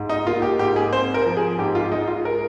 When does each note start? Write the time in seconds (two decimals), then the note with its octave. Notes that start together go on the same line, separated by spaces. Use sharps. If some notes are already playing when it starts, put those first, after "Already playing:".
Already playing: G#2
0.09 D#4
0.27 A#3 F4
0.42 G4
0.59 G#2 G4
0.76 G#4
0.92 C4 C5
1.14 A#4
1.25 F3
1.37 G#4
1.58 G#2 G4
1.75 F4
1.92 G#3 D#4
2.08 F4
2.25 A#4